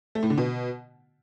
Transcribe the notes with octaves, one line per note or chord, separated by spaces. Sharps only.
A3
A2
D3
B2